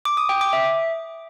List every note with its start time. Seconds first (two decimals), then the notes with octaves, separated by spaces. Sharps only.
0.05 D6
0.17 D#6
0.29 G5
0.41 D6
0.53 E5